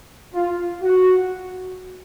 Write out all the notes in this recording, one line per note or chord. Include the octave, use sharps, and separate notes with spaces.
F4
F#4